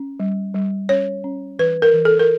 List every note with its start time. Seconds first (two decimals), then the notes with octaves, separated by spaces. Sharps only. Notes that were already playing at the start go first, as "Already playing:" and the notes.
Already playing: C#4
0.20 G3
0.54 G3
0.89 C#4 C#5
1.24 C#4
1.59 E3 B4
1.82 A#4
1.93 E3
2.05 A4
2.19 A#4